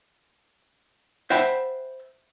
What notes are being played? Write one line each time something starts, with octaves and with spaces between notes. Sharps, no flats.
C5 E5 F#5 G5 A5 B5